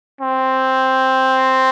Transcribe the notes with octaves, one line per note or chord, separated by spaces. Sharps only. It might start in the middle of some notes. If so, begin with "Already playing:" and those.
C4